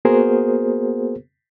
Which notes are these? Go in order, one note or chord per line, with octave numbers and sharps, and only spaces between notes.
A#3 B3 F#4 G#4 A#4 C5